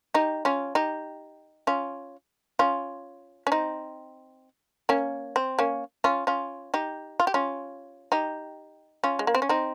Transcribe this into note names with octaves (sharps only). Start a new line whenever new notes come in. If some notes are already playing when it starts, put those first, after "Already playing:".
D#4 G4
C#4 F4
D#4 G4
C#4 F4
C#4 F4
C#4
C4 D#4
A#3 C#4
C4
A#3 C#4
C#4 F4
C#4 F4
D#4 G4
F4
G4
C#4 F4
D#4 G4
C#4 F4
G#3
A#3
C4
C#4
C4 D#4